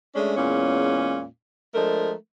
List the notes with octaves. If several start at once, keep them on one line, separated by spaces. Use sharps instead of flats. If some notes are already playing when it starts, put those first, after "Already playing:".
G#3 A3 C#4 D4
E2 A#2 G#3 C#4
F3 G#3 A3 D4 A#4